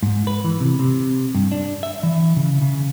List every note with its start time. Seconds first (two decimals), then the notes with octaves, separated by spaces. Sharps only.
0.03 G#2
0.27 B4
0.44 E3
0.60 C3
0.79 C3
1.35 G2
1.52 D4
1.83 E5
2.03 E3
2.37 C#3
2.61 C#3